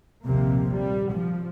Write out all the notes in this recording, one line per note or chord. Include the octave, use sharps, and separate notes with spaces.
A#1 D#2 C3 F3 A#3
G3
F3